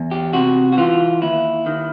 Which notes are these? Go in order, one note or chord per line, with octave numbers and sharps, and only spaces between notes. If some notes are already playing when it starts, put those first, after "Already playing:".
Already playing: E2
G4
C3 F#4
F#4
E3 F4
D#2 E4
D#3